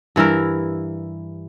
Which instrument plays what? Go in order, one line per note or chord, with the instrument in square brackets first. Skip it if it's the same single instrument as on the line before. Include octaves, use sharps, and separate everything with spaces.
[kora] G2 E3 E4 A#4